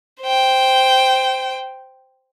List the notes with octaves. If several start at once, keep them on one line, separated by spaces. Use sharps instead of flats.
C5 G5